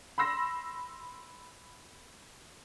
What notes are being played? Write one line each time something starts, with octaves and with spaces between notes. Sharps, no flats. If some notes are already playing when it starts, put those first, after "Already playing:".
B5 C6 E6 A#6